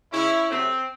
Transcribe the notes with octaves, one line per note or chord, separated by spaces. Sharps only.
C#3 G#3 C#4 E4
C3 F#3 A3 C4